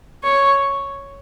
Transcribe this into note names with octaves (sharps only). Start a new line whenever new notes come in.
C#5